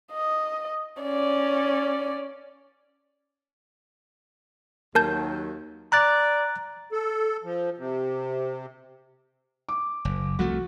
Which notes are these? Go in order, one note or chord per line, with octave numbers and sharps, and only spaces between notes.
D#5
C#4 D5
D#2 F#3 A#4 A5 G6
D5 A#5 F#6 A6
A4
F3
C3
D6
F#1
C2 F3 A3 F#4